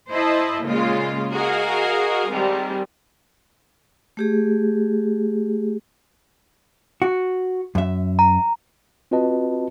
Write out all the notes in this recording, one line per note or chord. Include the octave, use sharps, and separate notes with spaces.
E4 C5 D#5 A5
A#2 C#3 G#3 F4
F#4 G#4 A#4 D#5 F5
D#3 G3 G#3 C4
A3 G4 G#4
F#4
F#2 E5
A#5
C4 F4 F#4 B4 D#5 A5